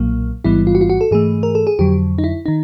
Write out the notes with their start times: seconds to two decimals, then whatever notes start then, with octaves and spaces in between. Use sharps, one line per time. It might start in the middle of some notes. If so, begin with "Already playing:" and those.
Already playing: B1 A#2 F#3 A#3
0.44 A1 G#2 E3 G3 B3 E4
0.67 F4
0.75 F#4
0.81 F4
0.90 F#4
1.01 A4
1.11 G#2 E3 A3 G#4
1.43 A#4
1.55 A4
1.67 G#4
1.79 F2 D3 F#3 G4
2.18 D#4
2.24 E4
2.46 D#3 D#4